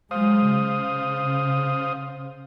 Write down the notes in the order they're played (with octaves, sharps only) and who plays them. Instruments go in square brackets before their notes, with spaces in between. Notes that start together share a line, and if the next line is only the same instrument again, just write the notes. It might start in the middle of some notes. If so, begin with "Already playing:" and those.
[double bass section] F#3 G#3 [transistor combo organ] C5 F5 D#6
[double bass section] C#3